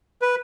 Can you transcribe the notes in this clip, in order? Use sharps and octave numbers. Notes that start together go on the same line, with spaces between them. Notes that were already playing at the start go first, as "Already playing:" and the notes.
B4